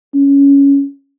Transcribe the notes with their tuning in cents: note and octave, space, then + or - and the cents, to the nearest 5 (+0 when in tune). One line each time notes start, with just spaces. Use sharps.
C#4 +10